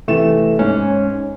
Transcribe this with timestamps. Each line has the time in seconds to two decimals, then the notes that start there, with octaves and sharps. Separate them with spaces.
0.08 C3 E3 A3 E7
0.59 G#2 C#4